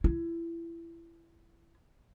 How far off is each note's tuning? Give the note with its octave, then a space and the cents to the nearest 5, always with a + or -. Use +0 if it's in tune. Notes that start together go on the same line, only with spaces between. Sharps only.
E4 +25